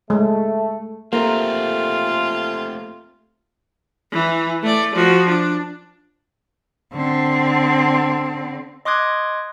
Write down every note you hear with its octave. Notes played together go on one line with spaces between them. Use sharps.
G#3 A3
A3 A#3 C4 F4 G4 A4 E5
E3
A3 D5
F3 F#4
D4
D3 C4
D#5 C6 D6 D#6 F#6 G#6